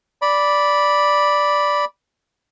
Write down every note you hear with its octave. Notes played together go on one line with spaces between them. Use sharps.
D5 B5